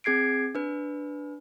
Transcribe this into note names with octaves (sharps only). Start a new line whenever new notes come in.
C4 G#4 G#6 C7 D7
D4 B4